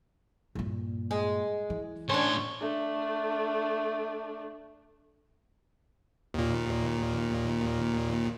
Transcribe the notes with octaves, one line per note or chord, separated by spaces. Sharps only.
G2 A#2
G#3
E3
A2 C#4 D4 C#5 C6
A3 D4
D#2 A#2